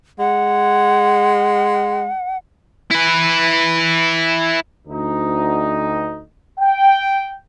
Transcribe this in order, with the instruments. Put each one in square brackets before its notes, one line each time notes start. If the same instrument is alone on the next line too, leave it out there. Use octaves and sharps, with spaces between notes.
[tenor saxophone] G#3 [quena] F#5
[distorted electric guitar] E4 B4
[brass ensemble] D2 D#4
G5